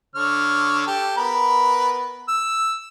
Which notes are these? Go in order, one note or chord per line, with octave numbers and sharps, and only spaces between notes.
D3 C#5 F6
G4 A4
B3 A#4 B4
E6